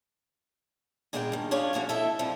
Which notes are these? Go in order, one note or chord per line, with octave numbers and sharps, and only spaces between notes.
A#2 G#3 B3 A#4 C5 G5
G2 D#3
C#4 D4 F4 G#4 C#5
A2 F3 A#3 F#4
E4 A4 D#5 E5
F2 F3 G3